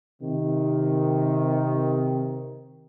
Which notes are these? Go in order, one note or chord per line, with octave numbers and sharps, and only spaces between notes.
C3 D#3